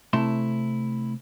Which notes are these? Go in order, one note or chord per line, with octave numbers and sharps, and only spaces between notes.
C3 A3 E4 A5 C6